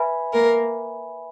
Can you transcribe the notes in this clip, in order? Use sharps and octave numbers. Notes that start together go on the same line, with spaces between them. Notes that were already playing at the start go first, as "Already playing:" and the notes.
Already playing: B4 E5 G#5 B5
A#3 A#4